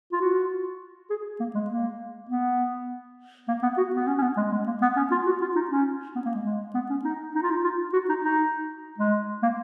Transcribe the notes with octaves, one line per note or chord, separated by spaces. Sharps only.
F4
F#4
G#4
A#3
G#3
A#3
B3
A#3
B3
F#4
B3
C#4
C#4
B3
G#3
G#3
A#3
B3
C#4
F4
F#4
F4
D#4
C#4
B3
A#3
G#3
G#3
B3
C#4
D#4
D#4
F4
D#4
F4
F#4
D#4
D#4
G#3
A#3